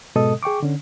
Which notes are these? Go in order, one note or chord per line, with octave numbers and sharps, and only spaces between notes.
G#2 B2 G#3 A4 D#5 D#6
G#4 G5 C#6 D6
D3 C#4